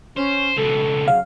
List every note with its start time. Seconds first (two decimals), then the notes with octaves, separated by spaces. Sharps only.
0.17 C#4 C5
0.57 C#2 B2 A4
1.08 C#3 F#3 F5